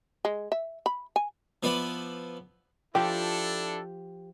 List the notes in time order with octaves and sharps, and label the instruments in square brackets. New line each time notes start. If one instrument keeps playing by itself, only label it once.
[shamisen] G#3
E5
B5
G#5
[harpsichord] F3 B3 E4 B4 D5
[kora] F3 [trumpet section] D4 E4 A4 [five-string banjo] G4